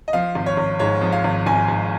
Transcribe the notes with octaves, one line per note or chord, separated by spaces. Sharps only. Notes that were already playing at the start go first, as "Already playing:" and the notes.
D#5
F3 F5
G#1
C#5
G#1
G#2 C#5
F3
F5
G#1
G#1 G#5
G#2